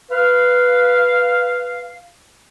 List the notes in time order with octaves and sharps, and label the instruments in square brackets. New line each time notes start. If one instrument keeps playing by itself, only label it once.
[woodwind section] B4 F5